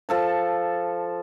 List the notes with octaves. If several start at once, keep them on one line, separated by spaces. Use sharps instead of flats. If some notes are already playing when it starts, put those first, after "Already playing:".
F3 A4 A5